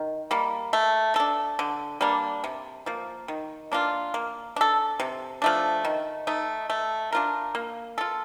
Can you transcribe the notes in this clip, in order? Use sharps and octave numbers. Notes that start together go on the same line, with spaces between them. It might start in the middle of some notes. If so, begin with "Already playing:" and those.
Already playing: D#3
G3 A#3
A3
D4 A4
D3
G3 A#3 D4
C3
F3 A#3
D#3
A#3 D4 F4
A#3
D4 A4
C3
F3 A3 D4
D#3
A3 D#4
A3
D4 F4 A#4
A#3
F4 A4